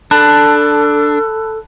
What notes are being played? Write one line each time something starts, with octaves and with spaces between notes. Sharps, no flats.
D4 A4 A5 B5 F#6